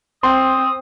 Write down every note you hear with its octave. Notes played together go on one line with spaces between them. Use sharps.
C4 C6 D#6